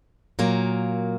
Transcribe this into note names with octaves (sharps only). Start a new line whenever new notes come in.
A#2 F#3 A#3